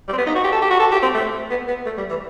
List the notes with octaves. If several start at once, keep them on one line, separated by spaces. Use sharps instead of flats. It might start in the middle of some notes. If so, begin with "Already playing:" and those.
G3
C4
B3
D#4
F#4
G4
A4
G4
F#4
A4
G4
C4
A3
B3
B3
A3
G3
E3